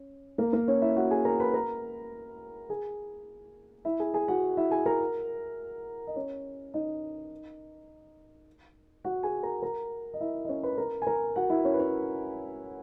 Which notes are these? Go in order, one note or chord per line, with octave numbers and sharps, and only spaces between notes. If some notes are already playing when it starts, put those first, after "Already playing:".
Already playing: C#4
A#3 A#4
A#3 A#4
C#4 C#5
E4 E5
F#4 F#5
G#4 G#5
A#4 A#5
B4 B5
A#4 A#5
G#4 G#5
E4 E5
G#4 G#5
G#4 G#5
F#4 F#5
E4 E5
G#4 G#5
A#4 A#5
D#5
C#4 C#5
D#4 D#5
F#4 F#5
G#4 G#5
A#4 A#5
A#4 A#5
D#5
E4 E5
D#5
C#4 C#5
B4 B5
A#4 A#5
G#5
A#4 A#5
F#4 F#5
E4 E5
C#4 C#5
B4
C#4 C#5